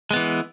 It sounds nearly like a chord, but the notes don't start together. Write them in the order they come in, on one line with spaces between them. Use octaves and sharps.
G#3 B3 E3